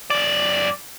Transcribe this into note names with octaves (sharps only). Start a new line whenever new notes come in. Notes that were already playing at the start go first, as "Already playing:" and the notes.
F#2 D5